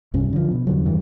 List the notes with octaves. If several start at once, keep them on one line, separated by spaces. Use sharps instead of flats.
C2 G2 C#4
D3 F3
B2
E2 D3 F#3
G2 D#3 E3